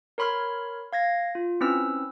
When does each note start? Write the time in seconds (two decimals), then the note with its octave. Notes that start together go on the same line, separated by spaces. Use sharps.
0.18 A#4 C#5 B5 C6 F6 G#6
0.93 F5 G#6 A#6
1.35 F4
1.61 C4 C#4 E4 B4 E6